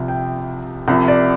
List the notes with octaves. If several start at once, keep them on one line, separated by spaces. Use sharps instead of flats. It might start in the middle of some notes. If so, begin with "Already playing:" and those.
Already playing: C2 C3 F3
G5
C2 C3 F3
D5